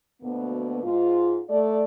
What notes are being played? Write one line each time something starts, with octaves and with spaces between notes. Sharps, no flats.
D2 B2 A#3 B3
G#2 F4
A3 D5